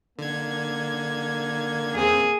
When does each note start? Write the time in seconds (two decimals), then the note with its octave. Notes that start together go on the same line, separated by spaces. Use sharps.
0.19 D3 A#3 G#6
1.95 E2 C4 G#4